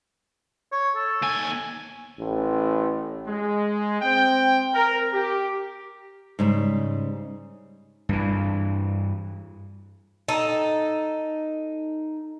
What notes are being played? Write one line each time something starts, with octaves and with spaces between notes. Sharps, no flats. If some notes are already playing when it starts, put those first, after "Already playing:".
C#5
A4
D#2 G#5
A1
G#3
C4 G5
A#4
G4
G#2 C#3 G3
G2 E3
D#4 A4